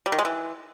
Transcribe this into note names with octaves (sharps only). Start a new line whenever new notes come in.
G3
D#3
G#3
E3